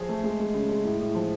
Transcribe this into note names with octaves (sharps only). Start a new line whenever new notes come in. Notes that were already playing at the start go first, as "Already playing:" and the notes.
Already playing: F3 G#4
A3
G#3
G#3
C#3
G#3
A2
A2
F3